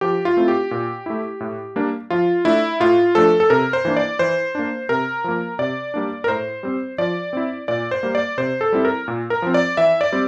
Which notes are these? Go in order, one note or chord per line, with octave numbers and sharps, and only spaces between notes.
F3 G4
F4
A3 C4 E4
G4
A#2
A3 E4
A2
G3 A#3 D4
F3 F4
A3 D4 E4
A2 F4
F3 A3 D4 A4
A4
C3 A#4
C5
E3 A#3 D4
D5
E3 C5
A#3 D4
C3 A#4
F3 A#3
C3 D5
G3 A#3 D4
A#4
A2 C5
G3 C4
F3 D5
C4 E4
A#2 D5
C5
G3 A#3
D5
C3 C5
A4
G3 C4 E4
A#4
A#2
A#4
F3 C4
D5
E3 E5
D5
G3 C4